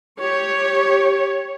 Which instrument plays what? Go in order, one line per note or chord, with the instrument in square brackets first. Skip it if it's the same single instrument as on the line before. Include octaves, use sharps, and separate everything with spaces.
[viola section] G4 C#5